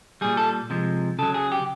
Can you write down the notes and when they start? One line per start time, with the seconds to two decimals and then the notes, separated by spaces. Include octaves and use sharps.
0.21 A#2 G3 G#4
0.37 A4
0.70 C3 F3 G#3
1.19 C#3 F#3 A4
1.34 G#4
1.52 G4